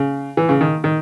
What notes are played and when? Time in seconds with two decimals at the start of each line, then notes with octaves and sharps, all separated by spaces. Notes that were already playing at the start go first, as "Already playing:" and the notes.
Already playing: C#3
0.37 E3
0.49 C#3
0.61 D#3
0.84 D#3